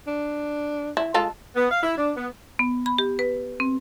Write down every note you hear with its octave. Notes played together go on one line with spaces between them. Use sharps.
D4
E4
G#3 F4 A4
B3
F5
E4
D4
B3
B3
B5
G4
B4
C4